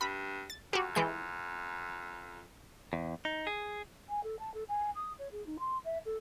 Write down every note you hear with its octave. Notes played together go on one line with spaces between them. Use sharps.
G2 B5
A6
F2 F#4 G4
E3 G#3 G6
E2
D#4
G#4
G#5
A4
A5
A4
G#5
D#6
C#5
G#4
D#4
C6
E5
A4